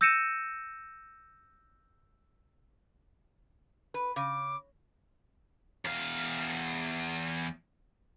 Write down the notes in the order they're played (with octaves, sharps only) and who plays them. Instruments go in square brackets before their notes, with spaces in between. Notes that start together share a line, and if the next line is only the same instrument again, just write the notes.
[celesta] E6 G6 A#6 C#7 D#7 E7
[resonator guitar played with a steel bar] B4
[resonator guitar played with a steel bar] C#3 [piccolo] D6
[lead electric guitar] E2 F5